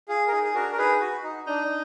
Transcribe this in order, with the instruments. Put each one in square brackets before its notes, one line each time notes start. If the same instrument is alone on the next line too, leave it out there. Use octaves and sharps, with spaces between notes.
[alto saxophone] F4 [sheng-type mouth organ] G#4
[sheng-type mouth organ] A#4
[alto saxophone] D#4 [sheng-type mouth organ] G#4
[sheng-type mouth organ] G#4
[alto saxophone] D4 [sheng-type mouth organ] F#4 A#4
[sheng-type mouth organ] A#4
[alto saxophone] D#4 [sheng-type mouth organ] G#4 B4
[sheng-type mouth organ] F#4
D#4
[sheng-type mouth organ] D4 [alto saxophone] D#4